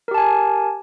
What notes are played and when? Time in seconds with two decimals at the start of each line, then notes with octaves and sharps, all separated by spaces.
0.08 A#4
0.11 G4
0.14 A5
0.18 G#5